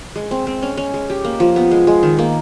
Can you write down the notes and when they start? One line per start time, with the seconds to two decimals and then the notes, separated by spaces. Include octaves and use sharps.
0.16 G#3
0.31 C4
0.47 C4
0.62 C#4
0.77 C#4
0.94 G#3
1.10 G4
1.25 A#3
1.40 F3
1.56 B3
1.71 G#3
1.87 G#3
2.03 D#3
2.19 A#3